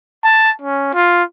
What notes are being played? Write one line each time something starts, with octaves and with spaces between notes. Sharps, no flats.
A5
C#4
F4